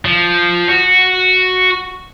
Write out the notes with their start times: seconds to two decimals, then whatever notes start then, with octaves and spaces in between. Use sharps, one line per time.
0.05 F3
0.68 F#4